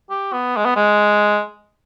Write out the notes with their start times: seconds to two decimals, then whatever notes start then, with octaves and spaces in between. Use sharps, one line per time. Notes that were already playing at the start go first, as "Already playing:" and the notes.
0.10 G4
0.33 B3
0.57 G#3
0.65 B3
0.76 G#3